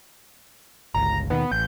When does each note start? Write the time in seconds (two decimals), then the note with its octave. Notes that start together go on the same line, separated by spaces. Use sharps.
0.94 G1 C#2 A#5
1.30 D#2 B2 D#3 B3
1.52 A1 G6